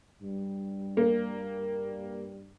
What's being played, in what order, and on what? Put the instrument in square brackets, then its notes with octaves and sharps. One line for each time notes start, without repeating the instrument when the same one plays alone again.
[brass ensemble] G2 G3
[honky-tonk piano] A#3